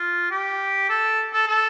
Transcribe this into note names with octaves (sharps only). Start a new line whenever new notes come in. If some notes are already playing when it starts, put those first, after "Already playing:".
Already playing: F4
G4
A4
A4
A4